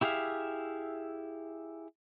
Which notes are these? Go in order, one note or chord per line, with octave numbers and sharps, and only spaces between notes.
E4 G4 G#4 E5 F5